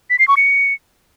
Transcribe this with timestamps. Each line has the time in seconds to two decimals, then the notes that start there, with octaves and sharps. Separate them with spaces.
0.10 B6
0.19 C7
0.28 C#6
0.37 C#7